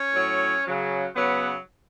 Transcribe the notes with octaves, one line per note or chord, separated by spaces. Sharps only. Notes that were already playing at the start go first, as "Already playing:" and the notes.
Already playing: C#4 C#5
A2 F#3
C#3 F#3
C#3 F#3 B3 B4